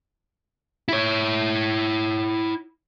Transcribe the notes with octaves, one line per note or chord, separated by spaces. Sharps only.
E4 C#5